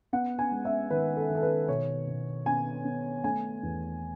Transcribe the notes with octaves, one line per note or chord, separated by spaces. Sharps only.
B3 F#5
G#5
G#3
E5
D#3 B4
A4
D#3
A4
B4
B2 C#5
B2
B3 G#5
B3
A3 G#5
E2